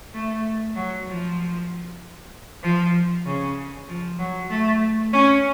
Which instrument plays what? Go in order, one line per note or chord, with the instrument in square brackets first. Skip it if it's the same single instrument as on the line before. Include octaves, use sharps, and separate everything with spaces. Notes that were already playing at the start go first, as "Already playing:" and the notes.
[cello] A3
F#3
F3
F3
C#3
F3
F#3
A3
C#4